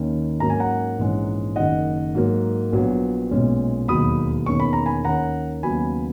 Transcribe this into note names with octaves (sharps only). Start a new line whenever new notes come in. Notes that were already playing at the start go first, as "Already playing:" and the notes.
Already playing: D#2 D#3 A#3 C#4
G#2 F#3 A#3 C#4 A#5
G#5
F#5 A#5
A#1 G#2 E3 G#3 C#4
F#1 F#2 D#3 D#5 F#5
G#2 F#3 A#3
A#1 A#2 F#3 B3
B1 A#2 G#3 C#4
E1 D#2 D#3 F#3 B5 D#6
E1 E2 D#3 A#3 C#4 C#6
B5
A#5
G#5 B5
D#2 D#3 A#3 C#4 F#5 A#5
D#2 C#3 F#3 B3 G#5 B5